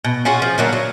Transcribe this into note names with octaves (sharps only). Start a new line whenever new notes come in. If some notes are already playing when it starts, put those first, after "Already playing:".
B2
C#4 F4 F#4 G#4
F3
D3 F#3 A#3
F#3